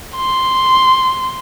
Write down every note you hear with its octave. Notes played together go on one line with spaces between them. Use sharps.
C6